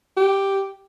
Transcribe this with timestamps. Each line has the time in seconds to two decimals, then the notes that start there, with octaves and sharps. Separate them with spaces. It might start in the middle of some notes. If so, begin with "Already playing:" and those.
0.17 G4